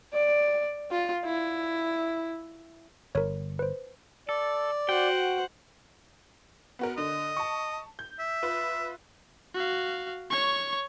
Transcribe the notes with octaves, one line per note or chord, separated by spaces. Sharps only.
D5
F4
E4
G1 A#4 C#5
B4 C5
A4 D5
F#4 C5 F#5 G5
B3 F#4 A#4
D3 D#5
A5 C#6
G6
E5
F4 B4
F#4 F5
C#5 C#6